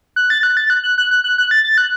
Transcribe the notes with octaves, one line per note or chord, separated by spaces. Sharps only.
F#6
A6
F#6
A6
F#6
F#6
F#6
F#6
F#6
F#6
A6
A6
F#6